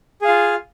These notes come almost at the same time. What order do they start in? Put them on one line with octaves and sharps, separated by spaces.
G#4 F5 F4